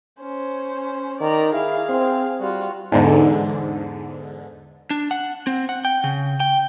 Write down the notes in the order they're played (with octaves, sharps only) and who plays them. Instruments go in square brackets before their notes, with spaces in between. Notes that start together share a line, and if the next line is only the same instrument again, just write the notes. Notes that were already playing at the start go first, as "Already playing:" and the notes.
[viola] C#4 C5
[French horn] D#3 [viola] D5 A#5
[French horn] E4 [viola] G#4 F5
[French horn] C4
[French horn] G3 [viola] F4 F#4
[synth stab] E2 G#2 D3
[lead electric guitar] D4
F#5
C4
F#5
G5
C#3
G5